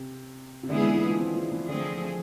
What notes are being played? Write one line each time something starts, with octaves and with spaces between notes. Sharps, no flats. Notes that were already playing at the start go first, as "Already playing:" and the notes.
Already playing: C3
C3
D3 G#3 B3 E4 G#4
E3
E3
F3
C4
F3
E3
D3 F3 A3 C4 G#4